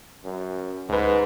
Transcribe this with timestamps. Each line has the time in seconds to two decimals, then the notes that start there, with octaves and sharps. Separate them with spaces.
0.24 F#2
0.89 D2 G#2 B4